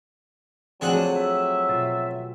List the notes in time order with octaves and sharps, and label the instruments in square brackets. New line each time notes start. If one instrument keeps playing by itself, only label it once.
[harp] F3 A3 E7 [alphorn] F#3 [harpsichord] C4 G#4 F#5 [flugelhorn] D4
[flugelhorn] E5
[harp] B2 F4 A6